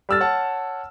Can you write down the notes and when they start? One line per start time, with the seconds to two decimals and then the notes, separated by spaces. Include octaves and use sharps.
0.09 G3 A4 E6 F6 A6
0.20 C#5 F#5 A5